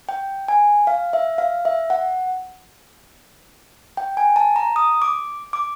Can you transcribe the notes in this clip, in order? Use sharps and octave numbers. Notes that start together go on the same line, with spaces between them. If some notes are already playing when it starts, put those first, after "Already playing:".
G5
G#5
F5
E5
F5
E5
F#5
G5
G#5
A5
A#5
D#6
D6
D6